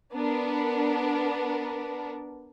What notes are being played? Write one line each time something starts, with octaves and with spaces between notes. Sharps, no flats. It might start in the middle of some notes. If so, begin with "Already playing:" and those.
B3 D4 A#4